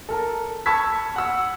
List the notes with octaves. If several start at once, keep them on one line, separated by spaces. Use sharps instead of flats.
A4 A#4 A5
A5 B5 C#6 E6 G#6 B6
F#5 E6